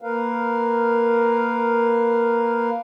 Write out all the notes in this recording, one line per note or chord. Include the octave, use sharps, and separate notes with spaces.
A#3 A#4 B4 F5